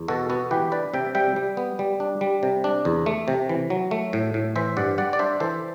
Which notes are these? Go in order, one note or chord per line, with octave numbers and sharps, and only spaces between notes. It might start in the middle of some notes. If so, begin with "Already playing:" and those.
Already playing: E2
B2 F#4 A4
B3 F#4 A4
E3 G4 B4
D4 B4 D5
C3 E5 G5
G3 E5 G5
G3
B3
G3
D4
G3
C3
D4
E2
A3
C3
E3
F#3
A3
A2
A2
E3 C5 E5
G2 D5 F#5
G3 D5 F#5
D5
D4 C5 E5
E3 A4 C5